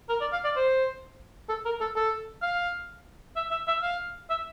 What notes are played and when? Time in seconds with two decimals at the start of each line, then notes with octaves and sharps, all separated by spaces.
0.09 A#4
0.21 D5
0.33 F5
0.45 D5
0.56 C5
1.49 A4
1.65 A#4
1.81 A4
1.96 A4
2.42 F5
3.36 E5
3.51 E5
3.68 E5
3.83 F5
4.30 E5